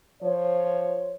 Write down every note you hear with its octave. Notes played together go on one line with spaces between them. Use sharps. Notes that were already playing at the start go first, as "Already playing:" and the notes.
F3 C5 C#5